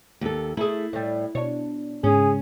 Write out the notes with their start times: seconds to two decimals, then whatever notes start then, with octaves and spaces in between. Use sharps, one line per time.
0.21 D#2 A4
0.57 A3 E4 G#4
0.93 A2 G3
1.35 B2 D4 C#5
2.04 G#2 C#3 C#4 G#4